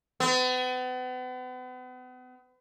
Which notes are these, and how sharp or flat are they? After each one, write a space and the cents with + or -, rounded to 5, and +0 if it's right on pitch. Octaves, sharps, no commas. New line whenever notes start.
B3 +40